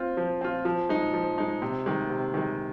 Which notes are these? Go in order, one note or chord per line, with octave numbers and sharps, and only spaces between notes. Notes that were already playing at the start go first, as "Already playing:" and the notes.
Already playing: C4 F4
F3
C4 F4
F3
G#3 D#4
F3
G#3 D#4
C3
D#3 G#3
C3
D#3 G#3